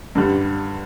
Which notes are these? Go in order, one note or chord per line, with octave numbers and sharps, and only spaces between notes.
G2 D3 G3